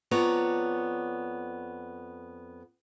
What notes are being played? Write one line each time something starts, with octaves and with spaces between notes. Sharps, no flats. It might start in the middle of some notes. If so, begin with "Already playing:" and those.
F2 B3 C#5 D5 A#5